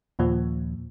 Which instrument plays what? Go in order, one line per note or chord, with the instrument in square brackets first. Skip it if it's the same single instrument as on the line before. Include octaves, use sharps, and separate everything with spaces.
[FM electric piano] D#2 A#2 F3